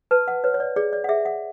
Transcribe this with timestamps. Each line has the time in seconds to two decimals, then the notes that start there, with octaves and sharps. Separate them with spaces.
0.11 B4 A5
0.28 F#5
0.44 B4 C#5
0.54 C#5
0.60 D5
0.76 G#4 D5
0.93 D5
1.04 F#5
1.09 G#4 E5
1.25 F#5